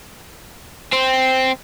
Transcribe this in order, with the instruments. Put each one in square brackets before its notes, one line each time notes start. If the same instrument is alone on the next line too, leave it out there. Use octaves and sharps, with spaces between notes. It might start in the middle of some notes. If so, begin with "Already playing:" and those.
[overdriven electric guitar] C4